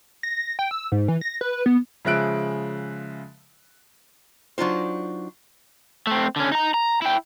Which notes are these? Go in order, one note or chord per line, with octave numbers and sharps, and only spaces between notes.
A#6
G5
E6
G#2
E3
A#6
B4
B3
C#3 F3 G#3 E5 F#6 D7
F#3 D4 D#4 F4 C5
A3 C4
D3 C#4
D#4 A#5
A#5
E4 G5